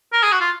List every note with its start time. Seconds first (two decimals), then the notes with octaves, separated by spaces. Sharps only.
0.13 A#4
0.23 G#4
0.32 F#4
0.40 F4